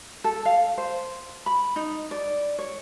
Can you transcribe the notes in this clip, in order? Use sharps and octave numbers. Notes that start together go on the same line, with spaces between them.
A4
F5
C5
B5
D#4
D5
C#5